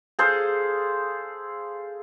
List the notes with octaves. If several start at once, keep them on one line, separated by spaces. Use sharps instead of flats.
G#4 A4 C5 F5